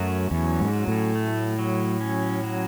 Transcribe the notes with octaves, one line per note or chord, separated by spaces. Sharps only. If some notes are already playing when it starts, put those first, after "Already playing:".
Already playing: F#2 F#3 A3
E2 C#4
G#2
F#3
A2
A3
F#3
C#4
F#3